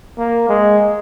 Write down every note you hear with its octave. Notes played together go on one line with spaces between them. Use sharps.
A#3
G#3